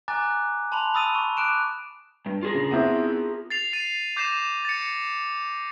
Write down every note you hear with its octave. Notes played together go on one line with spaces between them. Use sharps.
G#5 A#5 D6 F#6 A6
A5 B5 C6 F7
B5 D#6 E6 A6 D#7
C#6
D6 F#6 D7 E7
G2
F4 G#4 A#4
C#3
B3 C4 E4
A6 C7 F7
A6 C7 D#7 F7
D6 G6 A#6 C7 D#7 E7
D#7
A6 C#7